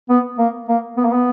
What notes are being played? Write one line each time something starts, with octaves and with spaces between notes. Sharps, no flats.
B3
A#3
A#3
B3
A#3
B3